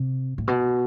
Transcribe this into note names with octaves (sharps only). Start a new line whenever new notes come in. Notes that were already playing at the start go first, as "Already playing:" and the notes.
Already playing: C3
A2
B2